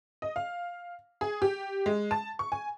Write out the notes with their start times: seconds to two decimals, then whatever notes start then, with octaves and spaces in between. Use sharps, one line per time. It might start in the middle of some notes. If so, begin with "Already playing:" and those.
0.22 D#5
0.36 F5
1.21 G#4
1.42 G4
1.86 G#3
2.11 A5
2.39 C#6
2.52 G#5